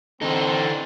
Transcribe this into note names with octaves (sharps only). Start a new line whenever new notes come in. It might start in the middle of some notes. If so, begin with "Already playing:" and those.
D3 E3 C4 D#4 A4